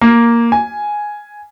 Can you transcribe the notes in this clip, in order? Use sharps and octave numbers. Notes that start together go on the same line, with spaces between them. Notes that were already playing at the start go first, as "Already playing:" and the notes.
A#3
G#5